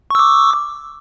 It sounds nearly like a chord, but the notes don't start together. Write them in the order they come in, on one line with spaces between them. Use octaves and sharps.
C#6 E6 D6